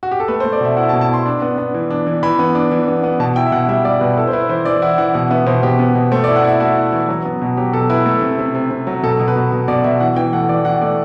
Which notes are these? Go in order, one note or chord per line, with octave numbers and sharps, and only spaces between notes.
F#4
G4
A4
A3 B4
C5
A3
D5
B2 E5
E4 F#5
A5
B2
A5
E4 C6
D4
B3
B3
E3
D4
E3
E3 B5
B3
D4
E3
B3
B3
B2 A5
E4 G5
E5
B2 F#5
G3 E5
G3 D5
B2 B4
E4 A4
C5
E4 B4
E3 C5
E3 D5
E4 F#5
E3 F#5
B2 F#5
B3 E5
B2 C5
B2 G4
B3
B2
A3 C5
D5
E4
F#5
E4 E5
A3 F#4
E4
E3
F#3
B3
B2
F#3 G4
B2 A4
E4 B4
A3
C3
C3
C3
C3
F#3
B2 A4
B2
B4
B2
B2
B2 D5
B2 E5
E3 F#5
E3 G5
A3 F#5
E3 D5
E3 F#5
A3 D5